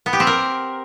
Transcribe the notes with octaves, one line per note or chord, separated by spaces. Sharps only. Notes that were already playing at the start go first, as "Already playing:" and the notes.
B3
G4
C4
A#4